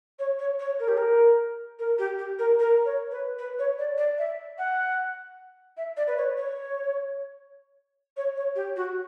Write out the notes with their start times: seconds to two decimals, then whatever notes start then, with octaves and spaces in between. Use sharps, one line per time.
0.19 C#5
0.39 C#5
0.59 C#5
0.79 A#4
0.88 G4
0.97 A#4
1.79 A#4
1.98 G4
2.18 G4
2.38 A#4
2.59 A#4
2.85 C#5
3.11 B4
3.38 B4
3.58 C#5
3.78 D5
3.97 D5
4.18 E5
4.58 F#5
5.77 E5
5.96 D5
6.07 B4
6.17 C#5
6.37 C#5
8.16 C#5
8.36 C#5
8.55 G4
8.76 F#4